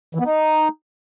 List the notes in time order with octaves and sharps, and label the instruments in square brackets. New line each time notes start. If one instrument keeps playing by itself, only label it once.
[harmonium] E3
B3
D#4